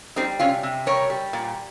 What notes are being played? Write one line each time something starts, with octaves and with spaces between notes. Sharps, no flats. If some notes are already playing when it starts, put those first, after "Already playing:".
G3 C4 D#4
C3 C#4 F4
C3
G3 A#4 C#5
G3
A#2